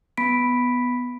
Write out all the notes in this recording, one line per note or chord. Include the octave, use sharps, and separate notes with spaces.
B3 B5 B6 D7